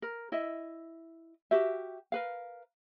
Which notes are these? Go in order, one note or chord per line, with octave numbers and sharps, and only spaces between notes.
A#4
E4 D#5 E5
F#4 G4 E5
A#4 B4 F5